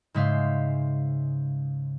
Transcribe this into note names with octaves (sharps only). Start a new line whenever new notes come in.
G#2 C#3 G#3 E5 F5 G6